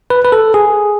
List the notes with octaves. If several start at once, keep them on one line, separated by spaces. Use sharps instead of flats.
B4
B4
A4
G#4